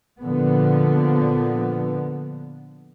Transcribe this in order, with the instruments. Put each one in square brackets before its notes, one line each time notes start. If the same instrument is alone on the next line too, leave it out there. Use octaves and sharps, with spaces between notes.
[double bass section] A#2 D3 F3 B3